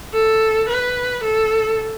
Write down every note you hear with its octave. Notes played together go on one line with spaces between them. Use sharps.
A4
B4
A4